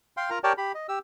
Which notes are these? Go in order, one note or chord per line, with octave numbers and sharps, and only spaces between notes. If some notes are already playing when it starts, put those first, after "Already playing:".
F5 G5 C6
F4 A#4 A#5
G4 A#4 C#5 D5 G5 A5
G4 B5
D#5
G4 E6